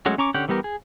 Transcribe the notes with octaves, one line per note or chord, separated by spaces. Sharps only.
F#3 G#3 A3 C#4 F#4
C#4 A#5 C#6 D6
D3 C#4 G4 F#5 G6
E3 G3 B3 G4 A#4
G#4